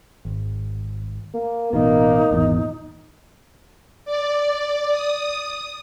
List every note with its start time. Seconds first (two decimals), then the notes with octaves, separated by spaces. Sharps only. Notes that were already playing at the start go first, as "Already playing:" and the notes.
0.25 G#1
1.34 A#3
1.73 A1 B2 A#3 D#4
2.31 G#1 E2 A#2
4.05 D5
4.91 D#6